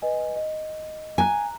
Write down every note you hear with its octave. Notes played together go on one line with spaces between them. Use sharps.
B4 D#5 G#5
D#5
G#5 A#5 F#6